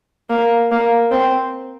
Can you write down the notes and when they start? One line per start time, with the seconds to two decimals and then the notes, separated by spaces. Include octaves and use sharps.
0.30 A#3
0.71 A#3
1.11 C4